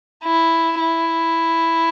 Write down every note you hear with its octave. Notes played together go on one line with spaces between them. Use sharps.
E4
E4